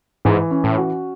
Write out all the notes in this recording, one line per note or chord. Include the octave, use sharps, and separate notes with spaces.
G#2 E3
C#4
A2
F#4